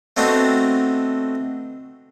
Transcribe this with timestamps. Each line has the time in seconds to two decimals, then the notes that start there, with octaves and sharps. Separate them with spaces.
0.17 A3 B3 C4 D4 D#4 F#4